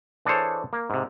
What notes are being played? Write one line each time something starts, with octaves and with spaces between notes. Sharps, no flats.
E3 D4 G#4 A4 C5 C#5
A#3
G#2 C3